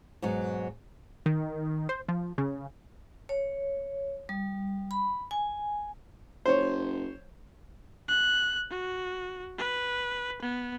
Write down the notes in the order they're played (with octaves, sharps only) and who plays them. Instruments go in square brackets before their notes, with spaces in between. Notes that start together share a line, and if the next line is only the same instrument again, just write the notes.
[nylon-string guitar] G#2 B2 F#3
[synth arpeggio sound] D#3
C5
F3
C#3
[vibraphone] C#5
G3
B5
G#5
[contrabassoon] F#1 [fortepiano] C5 C#5
[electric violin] F#6
F#4
B4
B3